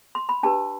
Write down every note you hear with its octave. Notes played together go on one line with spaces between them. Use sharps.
C6
B5
D4 G4 B4 A5